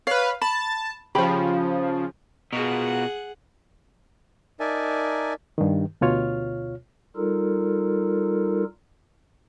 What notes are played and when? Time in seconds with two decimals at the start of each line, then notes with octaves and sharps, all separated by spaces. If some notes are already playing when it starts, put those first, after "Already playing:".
0.07 B4 C#5 F5
0.41 A5 B5
1.15 C#3 F3 G4 B5
2.53 B2 F4 F#4 G#4 A#4 F#5
4.60 D#4 A#4 D5 E5 G#5 A5
5.58 G2 D#3
6.01 D2 B2 F4 C#5 F6
7.16 G3 D#4 F4 A4 A#4